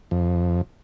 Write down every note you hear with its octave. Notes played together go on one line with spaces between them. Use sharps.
F2